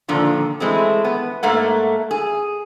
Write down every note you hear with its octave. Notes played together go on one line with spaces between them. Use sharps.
A#2 D3 D#3 F3
E3 G#3 A3 C4
B3
G#2 A3 A#3 F#5
G#4